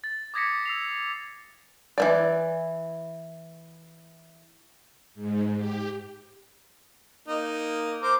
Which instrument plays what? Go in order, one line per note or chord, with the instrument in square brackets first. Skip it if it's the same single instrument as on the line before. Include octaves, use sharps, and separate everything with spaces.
[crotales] A6
D6 D#6 G#6 A#6 B6 C#7
E6 C7 F7
[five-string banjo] E3 A#3 D5
[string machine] G#2
G4
[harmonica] A#3 D#4
A#4 C5 D6